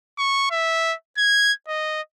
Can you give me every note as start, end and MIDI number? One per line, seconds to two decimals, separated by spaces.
0.18 0.47 85
0.51 0.94 76
1.18 1.52 92
1.68 2.01 75